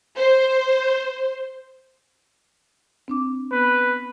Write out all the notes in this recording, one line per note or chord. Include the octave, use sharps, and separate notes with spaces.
C5
C4 D4 D6
B3 B4